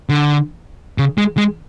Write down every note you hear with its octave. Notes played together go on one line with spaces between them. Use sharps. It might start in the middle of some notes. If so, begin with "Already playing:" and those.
D3
C#3
G#3
G#3